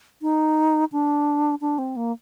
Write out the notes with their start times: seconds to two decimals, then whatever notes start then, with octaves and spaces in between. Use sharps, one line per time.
0.22 D#4
0.92 D4
1.61 D4
1.78 C4
1.96 A#3